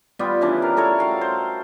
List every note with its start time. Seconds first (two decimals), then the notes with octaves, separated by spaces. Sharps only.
0.19 G3 B3 F4 G4
0.41 C#3 E3 D4
0.62 A#4 F5
0.77 E4 A4 A#4 C#5
0.99 F#4 F5 G5
1.21 C5